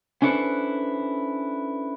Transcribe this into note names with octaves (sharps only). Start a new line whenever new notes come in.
C#4 D4 E4 A4 B4 C5